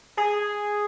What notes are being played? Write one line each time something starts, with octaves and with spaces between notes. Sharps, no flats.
G#4